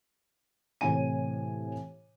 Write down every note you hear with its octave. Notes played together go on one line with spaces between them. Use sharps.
A2 C3 E3 C#5 G#5 D#7